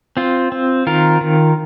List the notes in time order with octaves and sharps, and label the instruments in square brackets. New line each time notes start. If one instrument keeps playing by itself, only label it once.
[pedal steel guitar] C4 F4
C4
D#3 F4 A#4
D#3